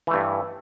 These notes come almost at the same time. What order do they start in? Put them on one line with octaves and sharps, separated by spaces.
E3 A3 G2